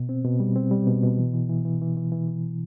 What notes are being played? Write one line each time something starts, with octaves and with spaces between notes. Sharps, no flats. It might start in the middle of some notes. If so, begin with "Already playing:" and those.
Already playing: B2
C4
B2
G3
C4
G3
B2
B2
E3
E3
E3
E3
E3
E3
E3
E3